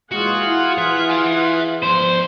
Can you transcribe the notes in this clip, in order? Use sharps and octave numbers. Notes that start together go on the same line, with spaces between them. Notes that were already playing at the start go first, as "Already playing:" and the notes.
A#2 E3 G#3 F4 F#4 G#4 F#5
E4
E3 E5
E5 G#5
F3 B3 C5